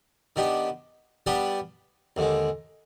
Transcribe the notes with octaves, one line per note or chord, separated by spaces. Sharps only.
D#3 B3 D4 G4
G3 B3 D4 G4
D#2 D3 G#3